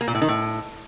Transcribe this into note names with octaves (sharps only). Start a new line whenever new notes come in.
A#3
A#2
A2
D#3
A2